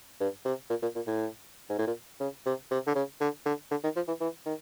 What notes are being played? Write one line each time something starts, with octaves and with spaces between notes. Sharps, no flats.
G2
C3
A#2
A#2
A#2
A2
G#2
A2
A#2
C#3
C3
C3
D3
C#3
D3
D3
D3
D#3
F3
E3
E3
D#3